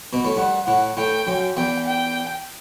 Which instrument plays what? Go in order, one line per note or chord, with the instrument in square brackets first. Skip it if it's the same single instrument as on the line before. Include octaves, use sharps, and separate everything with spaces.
[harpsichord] B2
A2
[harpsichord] G2 [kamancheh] F#5
[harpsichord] A2 [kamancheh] F#5
[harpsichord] A2 [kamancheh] G5
[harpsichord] F#2
[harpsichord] E2 [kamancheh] G5
[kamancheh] G5